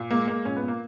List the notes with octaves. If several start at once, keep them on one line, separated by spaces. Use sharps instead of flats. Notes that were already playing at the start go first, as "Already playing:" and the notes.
Already playing: A#2
G#3 A#3
G#3 A#3
A#2 C#4
B3
A#2
A#3